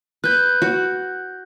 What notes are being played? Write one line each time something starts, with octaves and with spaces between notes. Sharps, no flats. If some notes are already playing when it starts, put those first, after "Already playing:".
B4 F#6 G6
F#4